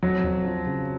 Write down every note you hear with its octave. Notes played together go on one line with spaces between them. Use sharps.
F2 F#3
F2
F3
C#3